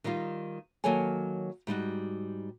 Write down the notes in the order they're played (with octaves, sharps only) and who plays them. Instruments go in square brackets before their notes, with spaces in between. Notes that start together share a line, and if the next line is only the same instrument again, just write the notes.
[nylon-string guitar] D#3 G3 D#4 F4
D#3 F#3 A#3 A4 C#5 G#5
G#2 G3 D#4 F#4